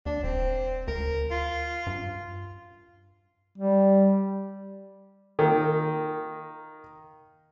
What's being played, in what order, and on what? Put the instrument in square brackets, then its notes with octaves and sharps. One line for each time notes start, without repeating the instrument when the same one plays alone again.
[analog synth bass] D#2 [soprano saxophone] D4
[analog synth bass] D#1 [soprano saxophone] C4
[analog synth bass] D2 [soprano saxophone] A#4
[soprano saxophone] F4
[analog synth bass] G2
[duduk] G3
[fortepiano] D#3 A#3